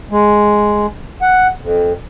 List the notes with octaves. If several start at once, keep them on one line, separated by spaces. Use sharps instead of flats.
G#3
F#5
F2